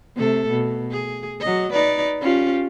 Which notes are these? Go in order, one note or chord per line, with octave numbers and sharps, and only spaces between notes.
C3 A3 A4
B2
G#4
F#3 D#5
D#4 B4 D5
C#4 F4 G4